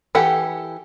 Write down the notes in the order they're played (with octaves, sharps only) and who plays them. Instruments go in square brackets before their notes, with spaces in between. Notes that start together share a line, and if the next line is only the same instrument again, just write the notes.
[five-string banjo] E3 G4 A4 F#5